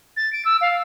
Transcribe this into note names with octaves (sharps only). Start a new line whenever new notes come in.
A6
D7
E6
F5